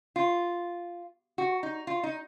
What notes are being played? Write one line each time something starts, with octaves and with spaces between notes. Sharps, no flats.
F4
F#4
D#4
F4
D#4